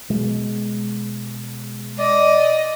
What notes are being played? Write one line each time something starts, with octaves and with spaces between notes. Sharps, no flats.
B2 G#3
D5 D#5